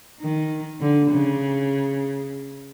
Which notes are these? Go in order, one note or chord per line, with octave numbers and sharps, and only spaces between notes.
D#3
D3
C#3